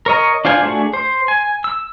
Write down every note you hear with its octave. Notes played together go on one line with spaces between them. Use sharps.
A#4 C#5 D#5
D4 F4 C5 G#5
A3 D4 F#4 G#4
C5
G#5
E6